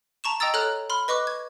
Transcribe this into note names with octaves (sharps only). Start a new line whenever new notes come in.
A5 A#5 C#6 E7
D#5 G5 A#5 D#6 E6 A6
A4 C#5 A#5 F6 F#6
B5 C6 F6
B4 D#5 C#6 D6 F#6
G#6